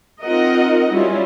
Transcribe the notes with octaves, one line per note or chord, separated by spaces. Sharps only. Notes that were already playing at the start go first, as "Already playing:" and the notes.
C4 D#4 F4 A#4 D#5 F#5
F#3 G3 C#4 E4 F4